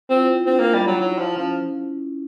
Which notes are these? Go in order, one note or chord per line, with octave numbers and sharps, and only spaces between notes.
C4 F4
E4
C4 D4
A#3
G3 D#4
F#3
F#3 E4
F3
F3 C#4